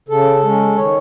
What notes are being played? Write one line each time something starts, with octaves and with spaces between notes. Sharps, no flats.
C#3 A4
G#3 C#4
D#3 C#5